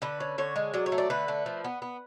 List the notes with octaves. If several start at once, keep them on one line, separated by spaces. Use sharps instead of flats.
D3 B4
C#4
D3 C#5
G#3
F#3 D5
C#5
A3
D5
D3 B4
A3
F3
B3
B3